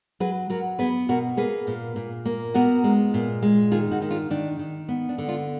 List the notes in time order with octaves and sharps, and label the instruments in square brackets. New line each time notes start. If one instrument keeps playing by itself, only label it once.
[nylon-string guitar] F#3 G#4 B4
F#3 F#4 A#4
B3 G#4 B4
B2 F#4 A#4
A#3 G#4 B4
A#2
A#2
A#3
B3 F#4 A#4
G#3
A#2
G#3
D#3 F4 G#4
D#4 F#4
D#3
D4 F4
D#3 D4
D#3
B3
D4
D3
D4 F4